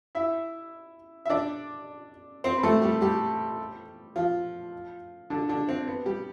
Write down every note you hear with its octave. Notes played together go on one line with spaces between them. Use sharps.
E4 E5
E5
D4 D5
C4 C5
B4
A3 A4
G3 G4
G3 G4
F3 F4
D3 D4
D3 D4
C4
B3
G3 G4